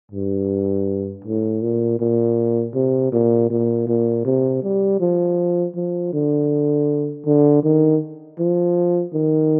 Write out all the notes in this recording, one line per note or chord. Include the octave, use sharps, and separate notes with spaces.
G2
A2
A#2
A#2
C3
A#2
A#2
A#2
C3
G3
F3
F3
D3
D3
D#3
F3
D#3